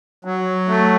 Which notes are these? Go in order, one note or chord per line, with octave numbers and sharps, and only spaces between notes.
F#3
A3